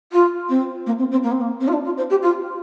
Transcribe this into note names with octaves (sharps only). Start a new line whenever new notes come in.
F4
C4
A#3
C4
C4
A#3
C4
A#3
C4
F4
D4
F4
C5
G4
F4